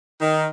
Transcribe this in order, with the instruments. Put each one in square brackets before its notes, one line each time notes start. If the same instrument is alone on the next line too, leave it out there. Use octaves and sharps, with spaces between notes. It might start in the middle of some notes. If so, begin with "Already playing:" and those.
[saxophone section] D#3